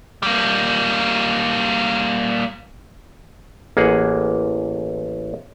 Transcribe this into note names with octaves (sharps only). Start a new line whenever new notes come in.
G3 A#3
A1 A#3 G#4 F#5